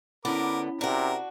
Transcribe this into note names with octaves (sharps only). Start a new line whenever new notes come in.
D3 B3 C#4 E4 A#4 D5 B5 D6
C3 D4 F#4 A#4